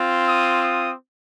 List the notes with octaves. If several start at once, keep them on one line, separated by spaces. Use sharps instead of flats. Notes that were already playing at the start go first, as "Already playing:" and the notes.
Already playing: C4 F4
D#6
D#6